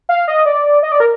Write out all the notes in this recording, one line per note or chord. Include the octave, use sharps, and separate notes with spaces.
F5
D#5
D5
D#5
D5
A#4